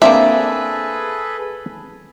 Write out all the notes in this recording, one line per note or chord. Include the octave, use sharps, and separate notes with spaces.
A#3 C4 D4 G#4 A4 B4 E5